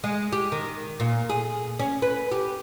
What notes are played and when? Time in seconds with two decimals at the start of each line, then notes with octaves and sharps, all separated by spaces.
0.04 G#3
0.32 G4
0.52 D#3
1.00 A#2
1.30 G#4
1.79 C#4
2.02 B4
2.31 G4